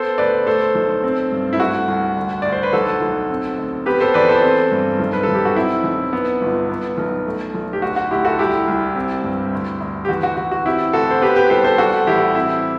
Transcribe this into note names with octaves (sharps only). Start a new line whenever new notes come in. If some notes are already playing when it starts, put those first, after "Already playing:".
Already playing: B3 A4 C5
D2 B4 D5
A3 A4 C5
B1
C4
G2
E4
A3 F#4
C2
D2
D2 D5
C5
B4
B1 F#4 A4
B1
C4
D2
B3 G4 B4
A4 C5
E2 B4 D5
A4 C5
C4
G2
B1
B4
A4
B1
G4
F#4
C4 E4
B1
B3
G1
B3
B1
A3
B1
G4
D2 F#4
F#4
D2 E4 G4
F#4 A4
C2 E4 G4
C2
C4
G2
D2
D2
G4
E2 F#4
F#4
E2 F#4
F#4
C4 E4 G4
D2 F#4 A4
C5
B3 G4 B4
G4 B4
C2 A4 C5
A4 C5
G3 F#4 A4
A1 E4 G4
C4 E4